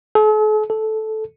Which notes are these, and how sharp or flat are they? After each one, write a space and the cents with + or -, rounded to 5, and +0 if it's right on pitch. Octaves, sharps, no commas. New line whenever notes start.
A4 -45
A4 -10